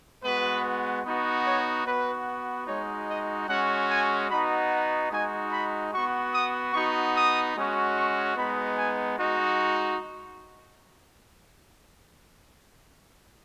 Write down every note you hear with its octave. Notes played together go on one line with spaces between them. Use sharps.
G#3 B3 F#4 B4
B3 D#4 F#4
C#5
B3 F#4 B4
G#3 D#4 F#4 C#5
D#5
G#3 C#4 F#4 F#5
G#5
B3 D#4 F#4 B5
F#5
G#3 D#4 F#4 G#5
B5
B3 F#4 C#6
D#6
B3 D#4 F#4 C#6
D#6
G#3 C#4 F#4
C#6
G#3 B3 D#4 B5
G#5
G#3 D#4 F#4